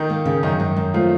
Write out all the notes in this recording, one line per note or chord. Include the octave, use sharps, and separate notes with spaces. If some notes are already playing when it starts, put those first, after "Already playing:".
Already playing: D#3 D#4
A#3
C#3
F#2 D#3 D#4
F#2
F#2
F3 A3 F4